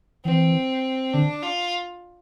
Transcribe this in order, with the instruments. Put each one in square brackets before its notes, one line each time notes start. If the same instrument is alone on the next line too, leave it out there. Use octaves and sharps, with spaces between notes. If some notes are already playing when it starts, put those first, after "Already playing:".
[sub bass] E3 [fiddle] C4
[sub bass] D3 [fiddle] D4
[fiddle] F4